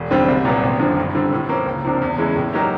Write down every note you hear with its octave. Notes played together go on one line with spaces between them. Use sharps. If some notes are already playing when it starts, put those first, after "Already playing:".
Already playing: E1
D#2 D3 G3 C4
C2
A#2 F#3 B3
G#1
F#2 D3 F3
G2
D3 G3 C4
A2
F3 A#3 C#4
C#2
C3 F3 A#3 D4
E2
C#3 E3 G#3
A2
F#3 A#3 D#4 G4